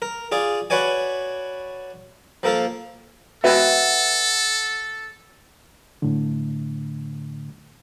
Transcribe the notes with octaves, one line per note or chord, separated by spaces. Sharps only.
A#4
F4 G#4 D5
F#4 B4 C#5 D5 G#5
F3 A#3 A4 A#4
F#4 A4 B4 E5
A2 D3